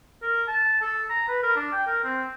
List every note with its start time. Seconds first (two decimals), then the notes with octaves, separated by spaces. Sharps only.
0.22 A#4
0.48 A5
0.82 A4
1.10 A#5
1.28 B4
1.43 A#4
1.57 D4
1.73 G5
1.87 A#4
2.04 C4